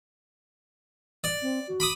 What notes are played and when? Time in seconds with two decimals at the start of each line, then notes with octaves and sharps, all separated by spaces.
1.24 D5
1.42 C4
1.68 F#4
1.80 B5 D6 D#6